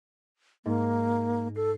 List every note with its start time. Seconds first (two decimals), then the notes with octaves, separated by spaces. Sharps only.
0.65 G#2 A#3
1.56 A4 C7